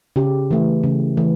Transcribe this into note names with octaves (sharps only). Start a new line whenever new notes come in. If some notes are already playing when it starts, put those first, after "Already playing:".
C#3 G4
E3 A3
C#3
E3 A3